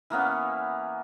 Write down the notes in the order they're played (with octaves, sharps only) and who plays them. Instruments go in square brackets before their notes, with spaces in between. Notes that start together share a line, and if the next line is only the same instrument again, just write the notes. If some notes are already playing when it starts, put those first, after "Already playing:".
[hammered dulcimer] E3 A#3 B3 C#4